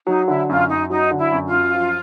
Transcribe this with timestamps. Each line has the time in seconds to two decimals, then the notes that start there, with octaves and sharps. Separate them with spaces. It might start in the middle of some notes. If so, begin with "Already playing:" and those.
0.07 F#3 D#4
0.28 D3 E4
0.49 F#2 F4
0.69 F#2 D#4
0.90 F#3 D#4
1.11 D3
1.18 E4
1.32 F#2
1.46 F4
1.53 F#2
1.74 F3